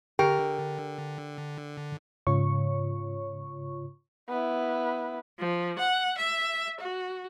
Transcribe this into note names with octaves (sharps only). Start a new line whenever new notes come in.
D3 G4 A#4 G5
G#2 C#3 F4 C#5 C#6
B3 E4
F3
F#5
E5
F#4